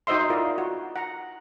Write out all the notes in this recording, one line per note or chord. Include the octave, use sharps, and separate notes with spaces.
D#4 F#4 C5 D#5 E5 C6
E4 F4 A#4 D5 D#5
F#4
F#5 A#5